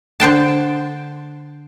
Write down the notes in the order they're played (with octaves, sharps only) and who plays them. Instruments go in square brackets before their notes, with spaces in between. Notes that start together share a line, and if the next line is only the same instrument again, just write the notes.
[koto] D3 C5 G5 A5